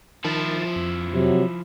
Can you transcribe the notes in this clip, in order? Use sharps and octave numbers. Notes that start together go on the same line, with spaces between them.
D#3 F3 E4 A5
F2
C3 F#3